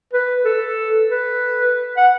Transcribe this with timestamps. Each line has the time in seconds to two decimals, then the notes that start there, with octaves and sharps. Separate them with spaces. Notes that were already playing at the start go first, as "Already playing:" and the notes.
0.13 B4
0.45 A4
1.10 B4
1.97 F#5